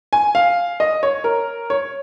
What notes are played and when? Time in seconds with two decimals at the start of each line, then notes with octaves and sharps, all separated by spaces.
0.13 G#5
0.35 F5
0.80 D#5
1.03 C#5
1.24 A#4
1.70 C#5